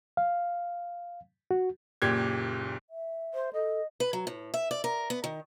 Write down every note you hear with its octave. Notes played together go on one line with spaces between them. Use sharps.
F5
F#4
F#1 A#2 G4 G#6
E5
C5
A4 D#5
B4
F#3
A2
E5
D5
A#4
B3
D#3